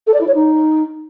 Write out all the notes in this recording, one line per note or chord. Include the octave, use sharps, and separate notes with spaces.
A4
D5
E4
C#5
D#4